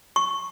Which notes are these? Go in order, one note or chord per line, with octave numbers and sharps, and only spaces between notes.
C#6